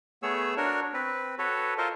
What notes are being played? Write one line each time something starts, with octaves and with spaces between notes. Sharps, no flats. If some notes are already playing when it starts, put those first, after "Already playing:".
A3 B3 G#4 C#5 E6
D4 F#4 A#4 C#5
C4 B4
F#4 A4 B4 C#5
F4 A4 A#4 C5 D#5